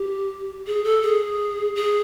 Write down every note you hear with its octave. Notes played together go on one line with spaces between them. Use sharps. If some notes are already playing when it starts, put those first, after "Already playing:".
Already playing: G4
G#4
A4
G#4
G#4